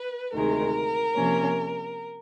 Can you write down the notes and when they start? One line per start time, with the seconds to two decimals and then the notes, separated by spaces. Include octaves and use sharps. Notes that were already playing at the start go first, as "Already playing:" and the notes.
Already playing: B4
0.33 D2 C3 D#3 G#3 A#4
1.15 C3 F3 A#3 C#4